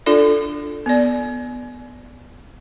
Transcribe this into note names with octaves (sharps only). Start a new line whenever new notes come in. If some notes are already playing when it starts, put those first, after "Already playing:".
D4 F4 A4 D5
B3 D5